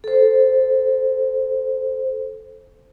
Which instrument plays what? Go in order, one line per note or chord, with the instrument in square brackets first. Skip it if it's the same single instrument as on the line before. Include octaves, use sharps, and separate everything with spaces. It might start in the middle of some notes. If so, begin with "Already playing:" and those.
[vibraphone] A4 C5